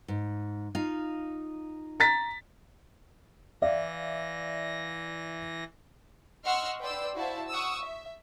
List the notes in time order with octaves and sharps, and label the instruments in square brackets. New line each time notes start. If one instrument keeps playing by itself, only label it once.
[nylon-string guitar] G#2
D#4 F4 F5
[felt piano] A#5 A6 B6
[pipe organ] E3 A#6 [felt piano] D5 E5 F5
[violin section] D#5 F#5 C6 C#6 E6 F6
B4 D5 G5 C6 E6
E4 F#4 C5 E5 F5 A5
F#5 C#6 D#6 E6
E5